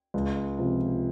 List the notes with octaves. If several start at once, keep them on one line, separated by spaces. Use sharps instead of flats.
C#2
C3 F3